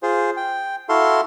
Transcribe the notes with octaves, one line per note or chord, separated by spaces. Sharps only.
F4 G#4 C5
G5
E4 F#4 A4 F5 C6